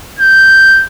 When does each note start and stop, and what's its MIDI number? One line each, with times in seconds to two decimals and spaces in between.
0.19 0.85 91